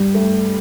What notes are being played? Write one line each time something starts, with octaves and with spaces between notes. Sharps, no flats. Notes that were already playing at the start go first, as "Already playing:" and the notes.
Already playing: G2 G3
G2 A3